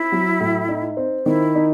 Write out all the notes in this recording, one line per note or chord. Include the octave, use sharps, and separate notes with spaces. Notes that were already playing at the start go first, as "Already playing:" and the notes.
Already playing: C4 E4
F#3
A2
D#4
C4
D#3 E4
D#4